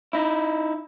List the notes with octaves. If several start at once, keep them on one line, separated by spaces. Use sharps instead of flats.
D#4 E4